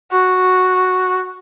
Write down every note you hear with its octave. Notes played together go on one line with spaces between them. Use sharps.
F#4